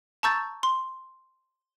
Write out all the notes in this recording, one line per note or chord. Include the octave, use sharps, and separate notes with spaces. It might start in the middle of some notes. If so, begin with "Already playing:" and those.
A5 A#5 C#6 E6 G6 A6
C6